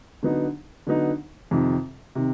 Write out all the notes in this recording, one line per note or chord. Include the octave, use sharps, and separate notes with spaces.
D3 F#3 B3 D#4
D3 F#3 B3 D#4
F2 C3 D#3
C3 D#3